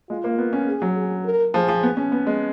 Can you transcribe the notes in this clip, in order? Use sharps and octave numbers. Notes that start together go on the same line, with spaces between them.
G#3 F4
A#3
B3
C#4
G#4
F#3
G#4
A#4
F3 G#4
F3
B3
C#4
B3
G#3